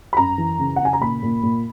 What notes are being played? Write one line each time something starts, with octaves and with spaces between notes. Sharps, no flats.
B5
F#2 A#5
E3
C#3
F#5
C#3 G#5
A#5
A#2 B5
A#2
A#2